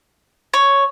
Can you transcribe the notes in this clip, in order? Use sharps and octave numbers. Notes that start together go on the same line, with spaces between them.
C#5